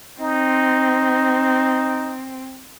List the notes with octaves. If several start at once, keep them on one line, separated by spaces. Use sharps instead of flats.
C4 D#4